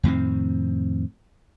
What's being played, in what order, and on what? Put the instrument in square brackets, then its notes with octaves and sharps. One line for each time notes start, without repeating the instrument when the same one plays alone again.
[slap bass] F2 A2 D#3 C4